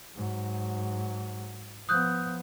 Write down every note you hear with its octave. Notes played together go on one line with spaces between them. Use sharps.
G#2 F#3
F3 B3 D#6 F#6 G6